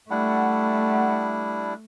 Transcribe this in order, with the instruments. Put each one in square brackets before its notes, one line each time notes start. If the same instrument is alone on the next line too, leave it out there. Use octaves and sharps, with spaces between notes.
[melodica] G3 D4 E4 [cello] A3 [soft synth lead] F#5